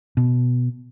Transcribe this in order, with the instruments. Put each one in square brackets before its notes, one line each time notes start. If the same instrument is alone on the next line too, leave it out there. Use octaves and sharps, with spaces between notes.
[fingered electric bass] B2